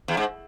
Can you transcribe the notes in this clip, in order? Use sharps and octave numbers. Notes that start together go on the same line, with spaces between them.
E2
G#2